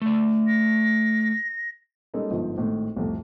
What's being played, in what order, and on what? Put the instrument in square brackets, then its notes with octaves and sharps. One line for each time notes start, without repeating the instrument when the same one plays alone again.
[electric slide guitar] A3 D5
[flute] A#6
[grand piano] G3 G#3 A#3 C#4 D#4 A4
G1 G#2 F3
G#1 A2
C2 F2 A2